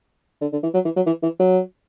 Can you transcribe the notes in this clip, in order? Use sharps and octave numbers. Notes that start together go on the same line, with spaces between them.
D3
D3
E3
F#3
E3
F#3
E3
E3
F#3